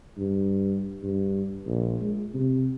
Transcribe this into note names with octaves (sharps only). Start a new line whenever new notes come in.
G2
G2
A#1
G#3
C3